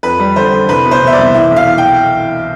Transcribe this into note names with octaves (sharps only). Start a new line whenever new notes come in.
F2 B4
G3
D3 C5
D3
C2 B4
B2
C5
B2 E5
D5
C2
E3 E5
B1
F5
E3
G5